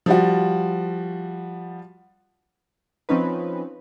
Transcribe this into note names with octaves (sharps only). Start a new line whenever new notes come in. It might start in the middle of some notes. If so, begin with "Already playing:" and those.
F3 G3 F#4
F3 C4 C#4 D#4 B4